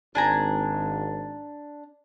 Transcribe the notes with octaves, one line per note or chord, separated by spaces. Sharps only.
G#1 D4 G#5 A#5